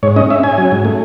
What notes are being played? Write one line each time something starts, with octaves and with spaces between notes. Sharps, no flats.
G#2 C#5
C#4 D#5
C#4 E5
C#4 G#5
F#3
G#2
A3